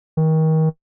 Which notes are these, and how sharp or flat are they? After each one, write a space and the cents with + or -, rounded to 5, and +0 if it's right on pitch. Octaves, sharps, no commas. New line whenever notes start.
D#3 +30